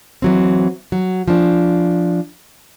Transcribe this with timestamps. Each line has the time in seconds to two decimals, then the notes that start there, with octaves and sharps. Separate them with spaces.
0.22 E3 F#3 C4
0.92 F#3
1.28 F3 D4